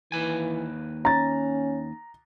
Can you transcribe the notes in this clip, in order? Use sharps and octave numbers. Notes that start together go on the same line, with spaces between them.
D#2 E3 B4 G#5
C#4 A#5 A6